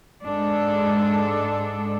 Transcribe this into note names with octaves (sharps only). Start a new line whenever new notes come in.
G#2 G#3 D4 A4